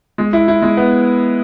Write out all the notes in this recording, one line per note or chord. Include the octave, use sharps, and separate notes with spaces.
G#3
E4
E4
G#3
B3